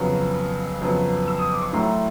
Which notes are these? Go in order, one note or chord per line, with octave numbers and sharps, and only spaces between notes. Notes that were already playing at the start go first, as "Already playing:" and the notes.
Already playing: F2 C#3 F#3 B3
F2 C#3 F#3 B3
E6
D#6
D6
C#6
A2 F#3 A3 A#5 C6